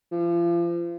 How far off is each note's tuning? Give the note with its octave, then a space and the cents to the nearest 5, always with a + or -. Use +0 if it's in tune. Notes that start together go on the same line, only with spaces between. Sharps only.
F3 -35